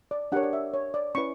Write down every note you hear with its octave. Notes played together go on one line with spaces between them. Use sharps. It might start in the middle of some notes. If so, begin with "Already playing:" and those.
D5
D4 G4 A#4 C#5 F#5
D5
E5
C#5
D5
C#4 E4 B4 C#6